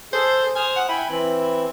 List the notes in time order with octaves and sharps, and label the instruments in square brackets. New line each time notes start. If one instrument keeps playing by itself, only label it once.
[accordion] G#4 A4 [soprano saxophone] C5
[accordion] C5 D#6 F6 [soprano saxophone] G#5
[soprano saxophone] F#5
[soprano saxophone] E4 [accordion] G5 G#5 B5
[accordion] E3 C4 [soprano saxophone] E4